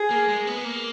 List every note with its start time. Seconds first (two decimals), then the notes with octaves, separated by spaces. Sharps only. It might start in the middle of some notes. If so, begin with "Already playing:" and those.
Already playing: G#4
0.11 A#3
0.29 G#3
0.47 B3
0.64 A#3